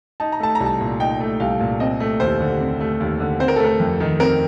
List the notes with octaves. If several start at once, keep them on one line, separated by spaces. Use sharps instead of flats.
D#4 A5
A#5
A3 A5
A#5
C2
A5
A#2
D#4 G5
A3
C2 F5
A#2
C4 D#5
A3
D#2 C5
D3
C4
A3
D#2
D3
C4 C5
A#4
A4
A3 A#4
F2
D#3
C4 A#4